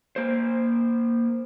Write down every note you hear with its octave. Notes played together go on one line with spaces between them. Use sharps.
A#3 C5